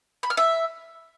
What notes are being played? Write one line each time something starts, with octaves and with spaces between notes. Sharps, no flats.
B5
F6
E5